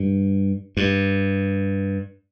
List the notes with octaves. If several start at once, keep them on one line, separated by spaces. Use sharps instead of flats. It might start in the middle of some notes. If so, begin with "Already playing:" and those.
Already playing: G2
G2